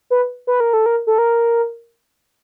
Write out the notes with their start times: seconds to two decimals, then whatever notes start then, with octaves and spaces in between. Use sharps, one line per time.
0.10 B4
0.47 B4
0.60 A#4
0.73 A4
0.86 A#4
1.07 A4
1.18 A#4